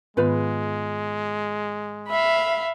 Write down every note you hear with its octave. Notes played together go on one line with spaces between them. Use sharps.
G#2 D#3 G#3 B3 F4 B4 F5
E5 F5 B5